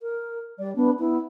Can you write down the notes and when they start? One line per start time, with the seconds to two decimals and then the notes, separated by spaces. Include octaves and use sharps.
0.01 A#4
0.59 G3 D5
0.76 B3 D4
0.99 B3 E4